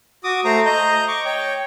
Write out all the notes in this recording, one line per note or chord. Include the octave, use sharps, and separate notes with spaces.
F#4 D6 D#6
A3 C5 A#5
D#5 A#5 G6
C#6 D6
C#5 G5